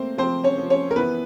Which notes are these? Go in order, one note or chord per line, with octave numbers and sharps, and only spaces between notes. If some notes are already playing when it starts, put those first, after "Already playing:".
Already playing: A3 A#3 C4 C5
F3 C4 C5
C#4 C#5
F3
C#4 C#5
A#4
E3 B3 B4